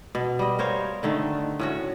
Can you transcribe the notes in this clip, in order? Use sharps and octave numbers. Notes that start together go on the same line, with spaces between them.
B2
G3 D#5
A#4 C5 C#5 F5
D3 D#3 A3
A2 C#4 F#4